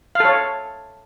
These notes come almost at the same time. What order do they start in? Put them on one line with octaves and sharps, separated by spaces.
F5 A4 C#5